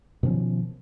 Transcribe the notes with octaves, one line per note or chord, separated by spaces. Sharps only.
B2 D#3 F3 C#4